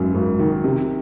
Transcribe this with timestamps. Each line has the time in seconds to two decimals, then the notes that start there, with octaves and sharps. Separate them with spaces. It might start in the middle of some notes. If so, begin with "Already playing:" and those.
Already playing: G#1 F#2
0.14 G#1
0.39 D#3
0.64 C3